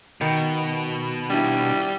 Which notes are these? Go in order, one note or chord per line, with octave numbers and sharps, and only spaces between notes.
B2 D#3
G3 D4 E4